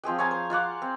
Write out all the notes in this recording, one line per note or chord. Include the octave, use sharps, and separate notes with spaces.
F3 C4 G#4 G5
C#5 F5 G#5 A#5
C5
F4 F5 F#5 D6
C4